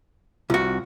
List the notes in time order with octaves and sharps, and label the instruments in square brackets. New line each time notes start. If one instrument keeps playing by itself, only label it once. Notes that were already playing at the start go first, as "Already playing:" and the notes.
[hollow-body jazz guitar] C2 F#4 [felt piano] F4